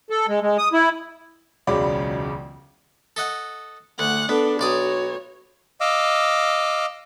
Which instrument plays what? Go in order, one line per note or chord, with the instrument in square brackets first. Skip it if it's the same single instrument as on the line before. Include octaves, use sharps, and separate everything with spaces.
[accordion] A4
G#3
G#3
D#6
E4
[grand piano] E1 C#2 C#3 F#3 D5 B5
[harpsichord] A4 D#5 F#5
[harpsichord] D2 [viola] F#5
[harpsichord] B3 [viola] D4 A4
[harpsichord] B1 D5 D#6 [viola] F#4 C#5
[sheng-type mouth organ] D#5 F5 D6 E6